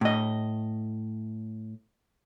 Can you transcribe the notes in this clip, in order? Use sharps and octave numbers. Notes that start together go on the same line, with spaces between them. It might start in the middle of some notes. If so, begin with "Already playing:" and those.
A2 D#5